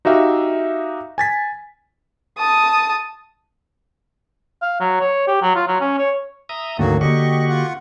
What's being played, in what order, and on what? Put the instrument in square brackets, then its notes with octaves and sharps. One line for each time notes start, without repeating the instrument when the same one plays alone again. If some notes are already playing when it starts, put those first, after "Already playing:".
[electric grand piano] D#4 F#4 G4 E5 F5
G#5 A6 B6
[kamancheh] A5 D#6
[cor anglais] F5
F#3
C#5
G4
F#3
F4
F#3
C#4
C#5
[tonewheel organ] E5 A#5 D#6
[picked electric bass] D2 G#2 A3 [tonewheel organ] D3 D#3 [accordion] F#3 A#3 F#4
[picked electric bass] D3 A#3 [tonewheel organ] F#4 G4 C#6 [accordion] D#5
[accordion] F4 F#5